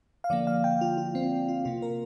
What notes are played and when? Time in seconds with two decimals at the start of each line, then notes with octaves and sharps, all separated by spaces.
0.24 F5
0.30 D3 F3 A#3 D5
0.47 F5
0.64 G5
0.81 F4
0.98 F4
1.15 C4
1.48 F4
1.65 C3 A#3 F4
1.82 A#4